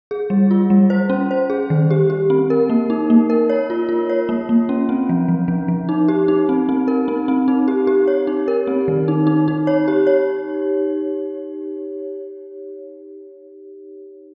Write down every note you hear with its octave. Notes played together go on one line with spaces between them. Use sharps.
G#4
G3
F4
G3
C5
C#4
C5
G#4
D#3
G4
G4
C4
A#4
A#3
D#4
A#3
A#4
C#5
F4
F4
C#5
A#3
A#3
C#4
C4
F3
F3
F3
F3
D#4
G4
D#4
C4
C4
A#4
C4
C4
D#4
G4
G4
C#5
D#4
A#4
C4
D#3
D#4
D#4
D#4
C#5
G4
C#5